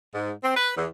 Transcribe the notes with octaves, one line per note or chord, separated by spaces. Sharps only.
G#2
C4
B4
E2